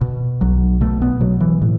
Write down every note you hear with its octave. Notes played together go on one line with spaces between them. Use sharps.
B2
B1 F#3
B2 A3
B3
B2 F#3
E3
A2 E3